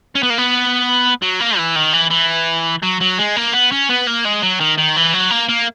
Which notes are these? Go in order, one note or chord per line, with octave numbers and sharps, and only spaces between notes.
C#4
B3
A#3
B3
F#3
A#3
E3
D#3
E3
E3
F#3
F#3
G#3
A#3
B3
C#4
B3
A#3
G#3
F#3
D#3
D#3
E3
F#3
A#3
A#3